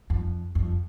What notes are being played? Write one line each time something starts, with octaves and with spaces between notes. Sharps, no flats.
F2
F2